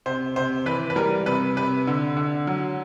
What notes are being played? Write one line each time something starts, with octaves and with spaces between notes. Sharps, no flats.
C3 C5
C3 C5
E3 B4
B4
G3 A#4
C3 B4
C3 B4
D3
D3
F#3